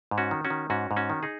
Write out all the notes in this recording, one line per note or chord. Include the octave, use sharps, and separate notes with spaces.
G#2
C#4 F#4
D#3
C#4 F#4
D#3
G#2 C#4 F#4
G#2
C#4 F#4
D#3
D#4 G#4